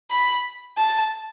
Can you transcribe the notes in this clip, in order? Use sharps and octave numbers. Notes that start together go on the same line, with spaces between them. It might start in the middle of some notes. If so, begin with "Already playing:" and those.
B5
A5